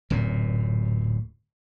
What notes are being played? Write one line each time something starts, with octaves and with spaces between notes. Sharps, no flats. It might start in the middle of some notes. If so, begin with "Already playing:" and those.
D1 F#2 A#2